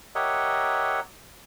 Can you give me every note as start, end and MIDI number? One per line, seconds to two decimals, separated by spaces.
0.15 1.00 67
0.15 1.00 70
0.15 1.00 73
0.15 1.00 75
0.15 1.00 76
0.15 1.00 78